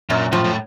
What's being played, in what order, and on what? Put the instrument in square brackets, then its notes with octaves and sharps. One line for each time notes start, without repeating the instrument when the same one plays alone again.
[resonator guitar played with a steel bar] F#2 [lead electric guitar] A#2
[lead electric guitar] A2 [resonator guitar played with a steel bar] F3
[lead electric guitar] A2